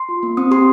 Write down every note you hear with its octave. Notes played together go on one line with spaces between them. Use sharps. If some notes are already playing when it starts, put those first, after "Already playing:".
Already playing: C6
F4
A#3
C4 D#6
G4 C6